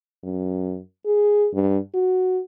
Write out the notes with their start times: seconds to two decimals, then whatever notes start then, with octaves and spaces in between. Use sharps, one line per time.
0.23 F#2
1.06 G#4
1.53 G2
1.94 F#4